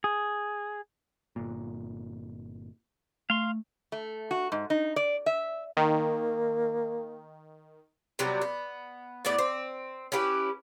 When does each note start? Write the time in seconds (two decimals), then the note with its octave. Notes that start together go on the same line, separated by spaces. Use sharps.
0.04 G#4
1.36 G1 A#2
3.30 A3 F5 C6
3.92 A3
4.31 F#4
4.52 G#2
4.70 D#4
4.96 D5
5.26 E5
5.77 D#3 A#3
8.19 C3 F#3 G3 B3
8.42 B3
9.25 A2 A3 B3 D5
9.38 C4
10.12 C#4 E4 G4 B4